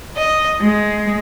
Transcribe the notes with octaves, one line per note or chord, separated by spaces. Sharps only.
D#5
G#3